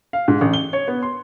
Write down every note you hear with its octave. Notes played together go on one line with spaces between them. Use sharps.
F5
G#2
A1
G7
C#5
B3
C6